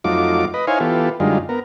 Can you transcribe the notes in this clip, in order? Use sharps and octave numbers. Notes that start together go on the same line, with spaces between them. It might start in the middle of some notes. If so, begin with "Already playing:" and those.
F2 F#3 A3 D#4 F4 D6
B4 D#5
D#4 E4 C5 C#5 F5 G#5
E3 B3 F4 G4 A4
F#2 D3 G3 G#3 D#4 F4
B3 A#4